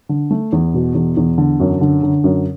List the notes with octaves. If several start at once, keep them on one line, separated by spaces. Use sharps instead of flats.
D3
A3
E2
B2
E2
E2
D3
F#2
D3
D3
F#2